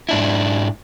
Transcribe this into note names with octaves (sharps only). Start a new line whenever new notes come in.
G#2 D4 E4